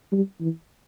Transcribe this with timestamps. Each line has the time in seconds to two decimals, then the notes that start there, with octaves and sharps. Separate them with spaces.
0.12 G3
0.41 E3